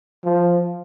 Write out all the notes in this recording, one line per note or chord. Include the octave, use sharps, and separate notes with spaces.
F3